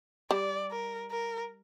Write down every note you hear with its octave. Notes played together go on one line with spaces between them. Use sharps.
G3 D5
A#4
A#4